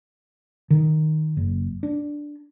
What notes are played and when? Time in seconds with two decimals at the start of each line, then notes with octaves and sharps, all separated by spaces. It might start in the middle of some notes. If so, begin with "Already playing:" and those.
0.70 D#3
1.37 F#1
1.83 D4